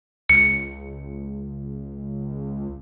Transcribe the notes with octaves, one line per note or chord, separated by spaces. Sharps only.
C#2 C#7